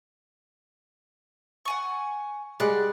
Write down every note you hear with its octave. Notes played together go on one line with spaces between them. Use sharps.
F#5 G#5 C#6
G3 G#3 D5 F#5 F#6